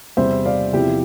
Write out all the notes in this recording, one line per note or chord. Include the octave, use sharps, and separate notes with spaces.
E2 C3 G3 C5 E5
D5 F5
E2 C3 F3 E4 G4